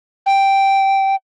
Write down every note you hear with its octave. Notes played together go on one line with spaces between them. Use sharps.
G5